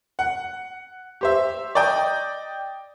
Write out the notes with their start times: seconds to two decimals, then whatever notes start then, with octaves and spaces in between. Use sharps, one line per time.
0.19 F#5
1.21 G4 C5 E5
1.75 D5 D#5 G5 D#6